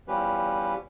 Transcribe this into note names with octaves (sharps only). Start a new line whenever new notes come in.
E2 F3 G3 C#4 G4 B4